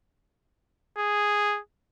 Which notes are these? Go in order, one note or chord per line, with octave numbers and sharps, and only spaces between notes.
G#4